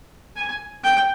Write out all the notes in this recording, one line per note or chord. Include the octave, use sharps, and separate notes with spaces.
G#5
G5